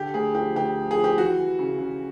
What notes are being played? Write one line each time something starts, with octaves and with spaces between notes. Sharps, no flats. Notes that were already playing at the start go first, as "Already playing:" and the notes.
Already playing: D3 G4
D2 G#4
F3 G4
D2 G4
F3
G#4
F3
G4
E3 F#4
E3
C#3
C#3